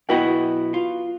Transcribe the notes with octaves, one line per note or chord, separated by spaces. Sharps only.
B1 B3 E4 F#4 D#5 G5
F4